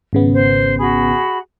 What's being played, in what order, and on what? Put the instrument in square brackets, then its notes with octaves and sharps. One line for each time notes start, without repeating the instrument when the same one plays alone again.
[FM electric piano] G#1 C#3 B3
[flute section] C5
F#4 G#4 B5